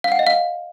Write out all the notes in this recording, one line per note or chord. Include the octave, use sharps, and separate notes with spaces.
F5
F#5
D#5
F5